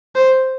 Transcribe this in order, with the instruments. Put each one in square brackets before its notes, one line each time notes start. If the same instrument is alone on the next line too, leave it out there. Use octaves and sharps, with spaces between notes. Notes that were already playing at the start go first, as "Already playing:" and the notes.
[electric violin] C5